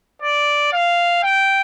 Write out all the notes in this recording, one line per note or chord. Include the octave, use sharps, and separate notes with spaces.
D5
F5
G5